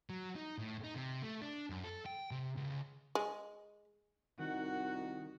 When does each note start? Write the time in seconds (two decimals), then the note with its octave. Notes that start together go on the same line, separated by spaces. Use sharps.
0.10 F#3
0.36 D#4
0.58 A2
0.84 D#4
0.95 C3
1.23 A3
1.42 D4
1.70 F#2
1.84 A4
2.06 G5
2.31 C3
2.57 C#2
3.15 G#3
4.39 C2 D#3 F#4 F#5